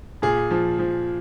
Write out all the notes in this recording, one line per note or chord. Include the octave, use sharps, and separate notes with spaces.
A#2 G#4
F3
F3